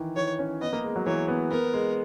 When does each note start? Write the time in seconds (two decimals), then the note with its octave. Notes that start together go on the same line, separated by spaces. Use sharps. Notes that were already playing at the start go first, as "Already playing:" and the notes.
Already playing: D#3 E3
0.16 E3 C#5
0.39 C#4
0.61 B3 D#5
0.73 A#3
0.84 G#3
0.96 F#3
1.06 E3 C#5
1.28 B3
1.51 B3 A#4
1.74 G#3